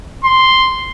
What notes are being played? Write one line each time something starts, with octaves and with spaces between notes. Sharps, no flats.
C6